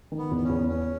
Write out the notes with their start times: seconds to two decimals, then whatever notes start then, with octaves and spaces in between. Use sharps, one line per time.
0.12 D#3
0.18 B3
0.31 E2
0.36 B3
0.44 C#4
0.49 E2
0.68 B3 C#4